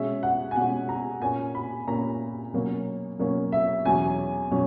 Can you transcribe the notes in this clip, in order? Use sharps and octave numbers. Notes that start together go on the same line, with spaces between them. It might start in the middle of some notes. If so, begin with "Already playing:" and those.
Already playing: B2 G#3 C#4 E5
F#5
G#5
B2 G#3 C#4 F#5
A#5
A#2 A#3 C#4 G#5
B5
A#2 A#3 C#4 A#5
B2 F#3 A#3 C#4
B2 F#3 A#3 C#4
E5
E2 B2 F#3 C#4 G#5
B2 F#3 C#4